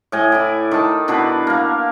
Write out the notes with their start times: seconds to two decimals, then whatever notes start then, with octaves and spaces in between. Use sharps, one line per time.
0.12 A2 D#5 G#5
0.32 E4 D5
0.71 D#3 A5
1.08 B2 D4 E4 B4
1.47 A#3 F5